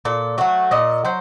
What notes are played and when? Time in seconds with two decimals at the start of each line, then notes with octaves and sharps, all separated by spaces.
0.05 A#2 A4
0.38 F#3 A3 F#4
0.71 A#2 D#5
1.05 F#3 C5